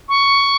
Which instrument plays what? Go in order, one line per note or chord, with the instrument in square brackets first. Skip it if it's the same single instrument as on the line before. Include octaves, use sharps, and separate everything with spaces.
[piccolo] C#6